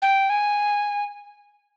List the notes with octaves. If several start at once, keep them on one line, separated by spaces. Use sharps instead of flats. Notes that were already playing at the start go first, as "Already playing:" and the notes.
G5
G#5